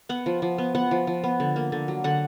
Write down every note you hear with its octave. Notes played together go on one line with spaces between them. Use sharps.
B3 F#5
F3
F3
B3
B3 F#5
F3
F3
B3
D3
A#3
D3
F#3
D3 F#5